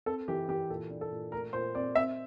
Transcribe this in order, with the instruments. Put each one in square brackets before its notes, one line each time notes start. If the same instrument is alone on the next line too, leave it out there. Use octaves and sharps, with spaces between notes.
[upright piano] C4 A4
E3 G4
E3 G4
A#2 A4
D4
A4
A#2
A3 A#4
A#2 C5
C4 D5
C4 E5